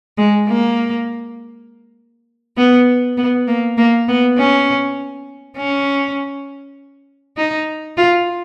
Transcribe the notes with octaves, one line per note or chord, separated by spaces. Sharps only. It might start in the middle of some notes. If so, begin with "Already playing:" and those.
G#3
A#3
B3
B3
A#3
A#3
B3
C#4
C#4
D#4
F4